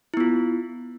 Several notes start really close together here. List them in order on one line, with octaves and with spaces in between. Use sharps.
E4 B3 F4